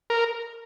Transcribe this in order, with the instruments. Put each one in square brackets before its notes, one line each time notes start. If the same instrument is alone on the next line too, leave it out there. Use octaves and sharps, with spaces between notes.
[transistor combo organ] A#4